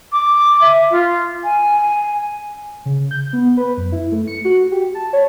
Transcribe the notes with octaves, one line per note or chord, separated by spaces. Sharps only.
D6
E5
F4
G#5
C#3
G6
B3
B4
F#2
E4
A3
C#7
F#4
G4
A5
C#5